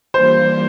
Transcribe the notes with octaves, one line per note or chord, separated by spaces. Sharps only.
E3 G3 A#3 D4 F4 C5